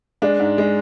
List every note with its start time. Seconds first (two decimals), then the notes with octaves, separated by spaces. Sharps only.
0.22 G#3 D4
0.40 G#2
0.58 G#3